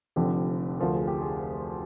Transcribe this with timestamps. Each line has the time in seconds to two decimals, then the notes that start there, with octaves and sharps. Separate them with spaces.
0.16 F1 F2 D3 G4
0.80 D2 D3 F3 A#4
0.94 G#4
1.07 G4
1.22 G#4